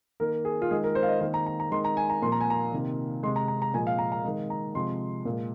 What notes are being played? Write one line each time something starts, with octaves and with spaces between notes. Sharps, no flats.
D#3 A#3 A#4
G#4
F4
D#3 G#3 G#4
A#4
C5
F5
D#5
D#3 A#3 C5
A#5
A#5
A#5
D#3 G#3 C6
A#5
G#5
A#5
A#2 F3 A#3 C6
A#5
G#5
A#5
C3 D#3 A#3
C3 G#3 C6
A#5
A#5
A#5
A#2 F3 G#3 G#5
F5
A#5
A#5
D#3 G#3
A#5
C3 F3 G#3 C6
A#2 G#3